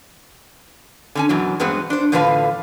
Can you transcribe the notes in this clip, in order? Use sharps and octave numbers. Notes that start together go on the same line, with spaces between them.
D3 C#4 G#5
F#2 B2 E3 F#3
E2 G2 G#3 B3 C4
D4 C5
E2 A2 D3 F3 B4 F5